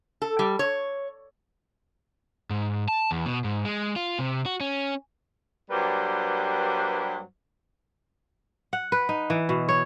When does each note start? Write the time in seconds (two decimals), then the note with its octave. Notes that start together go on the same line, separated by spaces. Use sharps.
0.22 A4
0.39 G3
0.59 C#5
2.50 G#2
2.88 A5
3.11 E2
3.26 B2
3.44 G#2
3.65 G#3
3.96 F4
4.19 C3
4.46 F#4
4.60 C#4
5.70 G2 F#3 G3 A#3 B4 C5
8.73 F#5
8.92 B4
9.09 D#4
9.30 E3
9.49 B2
9.69 C#5